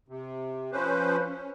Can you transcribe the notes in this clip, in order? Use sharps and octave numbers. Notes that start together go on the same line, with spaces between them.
C3
F3 C#4 B4 C5
C#4